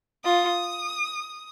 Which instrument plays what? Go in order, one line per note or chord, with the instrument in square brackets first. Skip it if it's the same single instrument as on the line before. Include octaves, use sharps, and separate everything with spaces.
[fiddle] F4 [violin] D#6